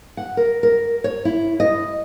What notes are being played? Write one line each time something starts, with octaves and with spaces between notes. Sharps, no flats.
F#5
A#4
A#4
C#5
E4
D#5